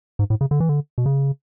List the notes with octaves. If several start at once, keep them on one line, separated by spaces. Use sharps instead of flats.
G#2
A2
C#3
D3
E3
D3
B2
C#3